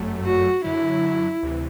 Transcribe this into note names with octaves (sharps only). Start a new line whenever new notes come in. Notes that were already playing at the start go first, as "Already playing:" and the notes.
Already playing: G1 F#2 F#3 A3
F#4
F#2 D3 F#3 E4
D2 C3 E3